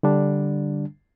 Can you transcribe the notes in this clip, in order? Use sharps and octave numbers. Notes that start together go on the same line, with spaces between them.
D3 G3 D4